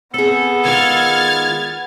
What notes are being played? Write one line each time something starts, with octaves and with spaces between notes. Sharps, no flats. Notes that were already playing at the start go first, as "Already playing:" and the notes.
B3 C4 G#4 A4
D#3 G#3 F4 F6 G#6 A6